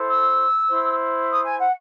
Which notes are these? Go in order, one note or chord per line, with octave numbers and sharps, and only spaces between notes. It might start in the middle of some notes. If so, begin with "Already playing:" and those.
Already playing: E4 A4 C5
E6
E4 C5
D#6
G#5
F#5